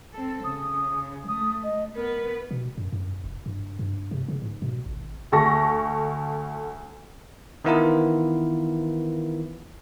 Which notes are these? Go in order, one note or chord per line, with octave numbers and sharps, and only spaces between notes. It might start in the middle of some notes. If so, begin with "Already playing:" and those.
C4 A4
C#3 D#6
A3 D#6
D#5
B3 A#4 B4
B2
F#2
F#2
F1
G2
G2
C3
C#3
G#2
B2
G#1
D2 A4 C#6 A#6
D#3 E3 B3 E4 F4 A#4